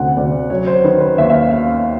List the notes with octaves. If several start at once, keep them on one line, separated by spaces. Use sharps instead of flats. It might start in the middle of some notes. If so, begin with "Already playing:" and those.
Already playing: D2 C3 F#5
D2 D5
F#3 C#5
C5
D#3 B4
B4
D#2 E5
E5
F5
F5